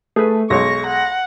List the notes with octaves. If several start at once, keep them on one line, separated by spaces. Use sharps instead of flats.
A3 G#4 B4
B1 G#3 C#5 C#6 A#6
F#5